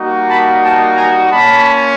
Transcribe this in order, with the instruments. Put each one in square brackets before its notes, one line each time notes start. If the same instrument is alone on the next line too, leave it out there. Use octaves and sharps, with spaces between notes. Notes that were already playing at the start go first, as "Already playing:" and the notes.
Already playing: [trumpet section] G3 A#3 D#4 F#4
A5 B5
G5 A5
G#5 A#5
A#3 C#4 F4 A5 B5